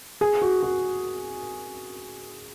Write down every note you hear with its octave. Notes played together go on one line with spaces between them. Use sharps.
G#4
F#4
F#4